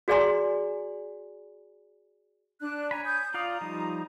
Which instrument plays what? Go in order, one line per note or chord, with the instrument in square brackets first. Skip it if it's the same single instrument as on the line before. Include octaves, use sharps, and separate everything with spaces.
[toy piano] F#4 G#4 D5 G#5 A#5 C6
[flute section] D4 F#6
[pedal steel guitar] C#5 G#5 B5 [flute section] A#5
[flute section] D#6 G6
[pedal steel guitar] F4 D5 F5 [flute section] A#5 D#6
[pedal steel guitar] F3 G3 D#4